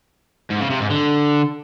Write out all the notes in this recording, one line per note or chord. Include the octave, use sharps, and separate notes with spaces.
G#2
C#3
C3
G#2
D3